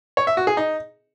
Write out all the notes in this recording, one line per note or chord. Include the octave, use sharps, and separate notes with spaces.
C#5
E5
F#4
G#4
D#4